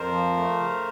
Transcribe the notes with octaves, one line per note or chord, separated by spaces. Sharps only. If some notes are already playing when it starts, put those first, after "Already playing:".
Already playing: F2 A#4 C5
F3
A3
C#3